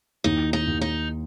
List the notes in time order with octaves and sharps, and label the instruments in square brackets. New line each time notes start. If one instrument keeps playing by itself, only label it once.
[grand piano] D#2 [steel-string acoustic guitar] D#4
[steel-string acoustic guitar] D#4
[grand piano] D#2
[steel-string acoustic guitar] D#4